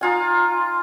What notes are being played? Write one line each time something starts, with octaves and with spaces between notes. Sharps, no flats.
D#4 F4 G#5